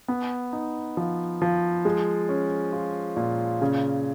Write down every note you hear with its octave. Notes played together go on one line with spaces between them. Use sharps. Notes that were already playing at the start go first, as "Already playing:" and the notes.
B3
D#4
F3
F3
G#3
C#4
F4
A#2
C#3